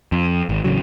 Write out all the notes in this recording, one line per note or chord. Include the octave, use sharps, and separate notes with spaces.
F2
G#1
A1 C#3 F#3